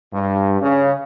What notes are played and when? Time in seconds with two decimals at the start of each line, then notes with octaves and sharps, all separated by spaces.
0.13 G2
0.61 C#3